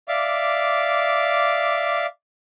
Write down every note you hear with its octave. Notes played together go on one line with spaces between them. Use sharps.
D5 E5 F5 D6